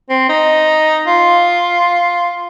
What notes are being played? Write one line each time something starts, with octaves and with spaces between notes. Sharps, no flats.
C4
D#4
F4